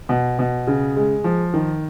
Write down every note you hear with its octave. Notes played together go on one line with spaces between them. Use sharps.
B2
B2
C#3
G#3
F3
D#3